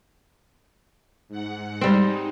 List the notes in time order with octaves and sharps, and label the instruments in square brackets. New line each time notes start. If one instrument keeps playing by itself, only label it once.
[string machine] G#2 F#5
[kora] G3 C4 [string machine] G#3 D#4